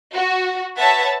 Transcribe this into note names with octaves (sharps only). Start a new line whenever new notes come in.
F#4
B4 C#5 E5 F#5 A5